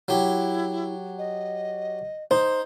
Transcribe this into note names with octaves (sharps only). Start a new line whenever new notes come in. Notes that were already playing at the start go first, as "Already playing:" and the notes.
F#3 E4 G4
D#5
D#4 C5